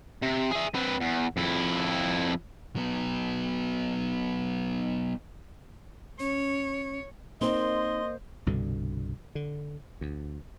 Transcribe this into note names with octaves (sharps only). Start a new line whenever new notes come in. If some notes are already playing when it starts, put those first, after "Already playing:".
C3
G#4 E5
C4 B4
E2
F2 E4
F#3 B3
C#4 C#5
A#3 C4 D#4 C5 D#5 C6
C2 G2 B2 D3
D3
D2